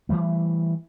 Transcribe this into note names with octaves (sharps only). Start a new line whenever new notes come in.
E3 F3 G3 A3